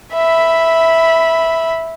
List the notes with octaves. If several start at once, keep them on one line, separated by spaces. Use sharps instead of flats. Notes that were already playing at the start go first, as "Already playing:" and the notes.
E5 B5